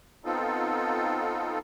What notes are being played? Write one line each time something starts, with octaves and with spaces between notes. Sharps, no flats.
B3 C4 D#4 F4 A4